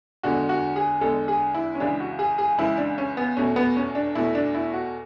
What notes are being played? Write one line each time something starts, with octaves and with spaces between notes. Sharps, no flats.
E2 D3 G#3 F#4
F#4
G#4
E2 D3 G#3 A4
G#4
E4
C#4
C#2 C#3 E3 G#3 D4
F#4
G#4
G#4
C#2 C#3 E3 G#3 E4
D4
C#4
B3
E2 B2 A3 C#4
B3
C#4
D4
E2 B2 A3 E4
D4
E4
F#4